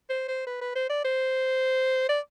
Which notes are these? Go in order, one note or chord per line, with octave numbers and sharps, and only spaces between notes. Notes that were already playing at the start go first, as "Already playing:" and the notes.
C5
C5
B4
B4
C5
D5
C5
D5